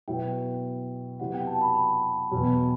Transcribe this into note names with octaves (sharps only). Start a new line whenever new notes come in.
B2 F#3 B3 E4 G5
C3 F#3 B3 E4 F#5
G5
A5
B5
B5
E2 B2 F#3